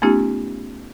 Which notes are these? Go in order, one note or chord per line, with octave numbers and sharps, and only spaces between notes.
A3 B3 C#4 D#4 F4 G4